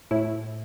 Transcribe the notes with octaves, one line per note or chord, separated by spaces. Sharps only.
A2 E4